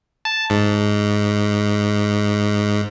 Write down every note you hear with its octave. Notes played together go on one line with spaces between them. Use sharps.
A5
G#2